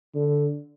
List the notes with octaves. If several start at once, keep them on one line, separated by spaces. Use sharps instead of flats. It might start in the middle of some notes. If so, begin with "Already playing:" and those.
D3